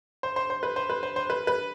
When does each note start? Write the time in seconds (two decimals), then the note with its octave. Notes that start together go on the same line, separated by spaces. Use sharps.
0.23 C5
0.36 C5
0.50 C5
0.63 B4
0.76 C5
0.90 B4
1.03 C5
1.16 C5
1.30 B4
1.47 B4